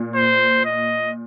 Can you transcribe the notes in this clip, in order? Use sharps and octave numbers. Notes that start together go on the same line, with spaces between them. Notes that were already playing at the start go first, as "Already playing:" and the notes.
Already playing: A#2
C5
D#5